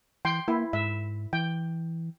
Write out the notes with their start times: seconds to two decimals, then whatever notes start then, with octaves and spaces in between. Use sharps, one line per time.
0.25 E3 G5 C6
0.48 A#3 E4
0.73 G#2 E5
1.33 E3 G5